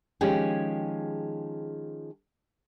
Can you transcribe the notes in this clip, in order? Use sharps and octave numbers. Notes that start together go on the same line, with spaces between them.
D#3 F3 G#3 C#4 G4 G#4